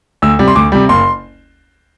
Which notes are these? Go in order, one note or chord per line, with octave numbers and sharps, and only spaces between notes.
D2 E6
C3 G3
C6
D2 D6
C3 G3
F#1 C6